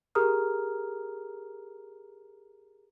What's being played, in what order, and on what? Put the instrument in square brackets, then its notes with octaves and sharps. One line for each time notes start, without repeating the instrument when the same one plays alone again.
[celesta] G4 G#4 A#4 A#5 D#6 F6